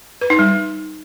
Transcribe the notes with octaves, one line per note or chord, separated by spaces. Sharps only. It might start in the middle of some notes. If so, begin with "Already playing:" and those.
B4
D#4
G3